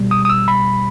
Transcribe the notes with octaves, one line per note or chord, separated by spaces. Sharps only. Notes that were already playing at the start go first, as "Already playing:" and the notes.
Already playing: B2 G3
D#6
D#6
E6
B5